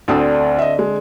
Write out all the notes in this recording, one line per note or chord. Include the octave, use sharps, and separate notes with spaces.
D2 D3 C4 D4 A4 D#6
D#5 E5
G#3